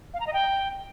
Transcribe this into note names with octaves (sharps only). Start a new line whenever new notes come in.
F5
A#5
D#5
G5